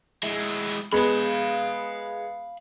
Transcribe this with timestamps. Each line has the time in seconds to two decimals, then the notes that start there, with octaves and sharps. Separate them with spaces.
0.23 G#3 E4
0.92 G#3 B3 F5 B5